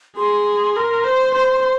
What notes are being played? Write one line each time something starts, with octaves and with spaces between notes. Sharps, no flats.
G#4 C6
A#4 C6
C5
C5